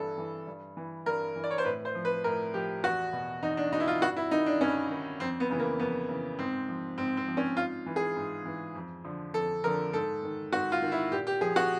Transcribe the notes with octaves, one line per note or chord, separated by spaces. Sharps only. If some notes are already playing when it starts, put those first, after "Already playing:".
Already playing: G2 E3 A4
E3
G2
E3
G2 A#4
E3
D5
C#5
C5
A2 B4
C5
F3
B4
A2 A#4
F3 G4
E2 F#4
B2
E2 D#4
D4
B2 D#4
E4
F4
G2 F#4
E4
D#3 D#4
D4
G2 C#4
D#3
F2 C4
B3
C#3 E3
A#3
F2 B3
C#3 E3
G#2 C4
F3
G#2 C4
C4
F3
C#4
G#2 F4
E3
G#4
G#2
E3
F2
D3 F3
F2 A4
D3 F3 A#4
G#2 A4
D#3
G#2 F#4
F4
D#3
E4
A#2 G4
G4
F3 G#4
F#4